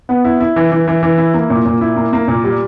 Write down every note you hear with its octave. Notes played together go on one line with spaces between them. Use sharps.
B3
E4
E4
E3
E3
E3
E3
E4
A#3
A#2
A#2
E4
A#3
A#3
A#2
G3